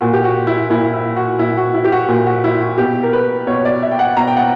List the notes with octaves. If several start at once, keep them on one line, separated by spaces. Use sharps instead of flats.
A#2 F#4
G4
F#4
E4
A#2 E4
E4
F#4
A#2 E4
F#4
E4
G4
F#4
A#2
F#4
E4
F#4
B2 G4
A#4
B4
B2 C#5
D5
E5
G5
F#5
B2 A#5
G5
F#5